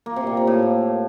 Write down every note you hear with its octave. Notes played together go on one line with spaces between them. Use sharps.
A#3
C3
A#2
A#3
A2